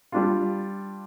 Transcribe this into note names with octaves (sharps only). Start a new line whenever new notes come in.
G3 D4 F4